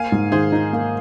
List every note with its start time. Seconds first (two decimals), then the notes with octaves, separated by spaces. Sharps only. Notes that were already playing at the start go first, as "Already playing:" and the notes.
Already playing: A#3 F5 G#5
0.12 G#2
0.32 D#3 G#4 C5
0.52 D#4
0.73 A#3